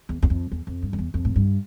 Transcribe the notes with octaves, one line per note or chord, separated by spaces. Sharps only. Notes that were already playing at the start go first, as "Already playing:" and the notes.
E2
E2
F2
E2
F2
G2
F2
E2
F2
A2
G2